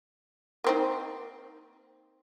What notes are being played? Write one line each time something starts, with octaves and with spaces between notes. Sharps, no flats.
A#3 C4 D#4